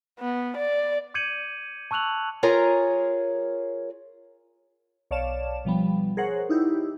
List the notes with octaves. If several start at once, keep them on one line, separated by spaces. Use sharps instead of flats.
B3
D5
D6 G6 G#6 C#7 D#7 F#7
A5 C#6 E6 F#6 F7 F#7
F4 G#4 A#4 C#5 G#5 A#5
B1 C#5 D5 F5 A5 E7
B2 F3 G3 B3
G#4 A#4 C5 C#5 F#5
D#4 E4 G4